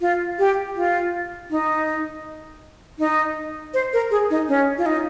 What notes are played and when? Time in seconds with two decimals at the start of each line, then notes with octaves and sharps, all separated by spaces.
0.01 F4
0.39 G4
0.76 F4
1.51 D#4
2.99 D#4
3.74 C5
3.93 A#4
4.11 G#4
4.30 D#4
4.49 C#4
4.78 F4
4.86 D#4